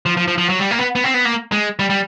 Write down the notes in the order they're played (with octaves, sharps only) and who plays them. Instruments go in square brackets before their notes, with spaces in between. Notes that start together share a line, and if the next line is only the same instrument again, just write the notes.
[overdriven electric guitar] F3
F3
F3
F3
F#3
G3
A#3
B3
B3
C4
B3
A#3
G#3
G3
G3